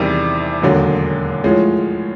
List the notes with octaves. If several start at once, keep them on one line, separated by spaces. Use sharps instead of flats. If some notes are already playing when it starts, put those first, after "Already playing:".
Already playing: E2 C3 D#3 G3
E1 D#2 D3 F#3
A2 F3 G#3 C#4